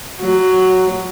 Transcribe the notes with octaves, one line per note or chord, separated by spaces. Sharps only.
F#3